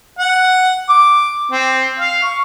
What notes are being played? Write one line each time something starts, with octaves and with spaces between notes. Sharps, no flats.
F#5
D6
C4
F5
C#6